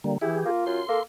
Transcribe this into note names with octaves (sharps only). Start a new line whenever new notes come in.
D3 G3 A#3
E3 E4 G4 G#4
A#3 F4
F#2 C6
A#3 A4